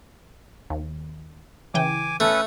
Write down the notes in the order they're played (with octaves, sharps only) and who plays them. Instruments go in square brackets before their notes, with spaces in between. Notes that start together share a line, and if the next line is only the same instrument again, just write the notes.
[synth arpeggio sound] D#2
[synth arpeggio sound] C#3 E3 G5 [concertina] G#5 D6
[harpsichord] A3 [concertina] C#4 A4 B4